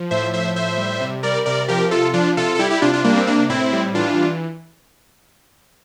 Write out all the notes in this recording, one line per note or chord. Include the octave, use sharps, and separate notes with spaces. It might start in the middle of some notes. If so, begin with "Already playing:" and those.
Already playing: F3
A2 C5 E5
F3 C5 E5
A2 C5 E5
G3
C3
G3 A#4 D5
C3 A#4 D5
F3 G4 A#4
C3 F4 A4
F3 D4 F4
C3 F4 A4
A4
G3 E4 G4
E4 G4
C3 D4 F4
D4 F4
G3 A#3 D4
C4
C3 A#3 D4
A2 C4 E4
G3
E3 D4 F4